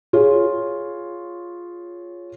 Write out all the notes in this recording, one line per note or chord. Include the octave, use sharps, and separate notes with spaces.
F4 G#4 C#5